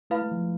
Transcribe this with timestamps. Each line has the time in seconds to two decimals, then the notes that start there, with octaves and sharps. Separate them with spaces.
0.10 A3 E4 B4 F5 B5
0.22 G#3
0.31 F3